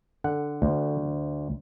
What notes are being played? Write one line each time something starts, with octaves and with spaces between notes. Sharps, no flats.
D3 F#5
D2